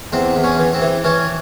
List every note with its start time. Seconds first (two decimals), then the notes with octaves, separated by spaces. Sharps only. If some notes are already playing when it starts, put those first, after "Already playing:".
0.12 E2 C4
0.36 E2
0.43 C#4
0.59 E3
0.73 C4
0.81 E3
1.04 E3 C#4